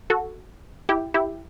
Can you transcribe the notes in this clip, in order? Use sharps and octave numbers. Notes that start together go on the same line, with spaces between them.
F#4 A4
E4 G4
E4 G4